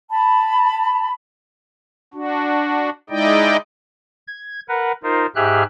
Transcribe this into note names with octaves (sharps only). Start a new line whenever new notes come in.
A5 B5
D4 F#4
G#3 D#4 E4 D5 D#5 G5
G#6
A#4 B4 F#5
D#4 F4 A#4 C5
G#2 G4 G#4 E5 F6 F#6